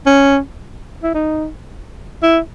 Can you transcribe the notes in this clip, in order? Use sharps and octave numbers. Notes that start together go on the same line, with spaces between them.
C#4
E4
D#4
E4